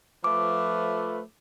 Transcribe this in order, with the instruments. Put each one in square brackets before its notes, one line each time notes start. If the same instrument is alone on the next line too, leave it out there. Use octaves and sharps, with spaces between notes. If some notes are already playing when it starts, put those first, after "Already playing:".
[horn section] F3 A3 B4 [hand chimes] D6